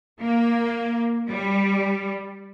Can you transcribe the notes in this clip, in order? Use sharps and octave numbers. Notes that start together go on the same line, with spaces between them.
A#3
G3